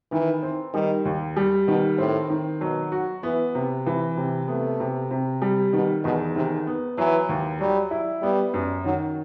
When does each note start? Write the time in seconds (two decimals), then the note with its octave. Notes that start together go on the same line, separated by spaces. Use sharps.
0.12 D#3 E3
0.43 C4
0.74 D#3 G3
1.05 D#2
1.37 G3
1.67 B2 D#3
1.98 A2 C4
2.30 D#3
2.61 B2 F#3
2.92 F#4
3.23 E3 B3
3.55 C3
3.86 E3
4.17 C3
4.48 A3 B3
4.80 C3
5.11 C3
5.42 G3
5.73 B2 D#3
6.04 E2 B2
6.35 C3 D#3
6.67 B3
6.98 E3 F#3
7.29 D#2
7.60 F#3 G3
7.91 E4
8.22 G3 B3
8.54 F#2
8.85 D#3 F#3